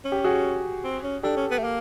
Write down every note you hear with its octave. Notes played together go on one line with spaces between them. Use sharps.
C#4
G4
F#4 G#4
C4
C#4
D4 G4 A4
C#4
B3
A3
A#3